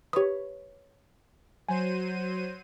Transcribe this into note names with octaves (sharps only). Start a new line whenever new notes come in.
G4 B4 C#5 D#6
F#3 C5 G#5 D#7